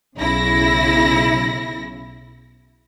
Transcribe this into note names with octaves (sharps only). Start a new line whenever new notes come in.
B1 C#3 E4 A#6